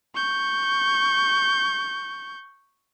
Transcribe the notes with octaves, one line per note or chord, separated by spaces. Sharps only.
C#6 G6